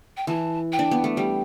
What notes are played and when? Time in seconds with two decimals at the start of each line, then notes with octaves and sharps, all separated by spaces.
0.17 G5
0.27 E3 A5
0.72 G5
0.79 D4
0.91 B3
1.04 A3
1.17 G3 G5